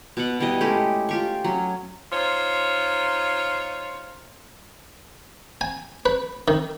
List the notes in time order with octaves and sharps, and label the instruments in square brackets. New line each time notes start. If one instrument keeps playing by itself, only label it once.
[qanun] B2 F#5
B2 G3 E4 D#5
G#3 A3 C#4 G4
F4 G4 C#6
F#3 C#4
[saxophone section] D#4 F4 C5 C#5
[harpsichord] G#5
B4
D#3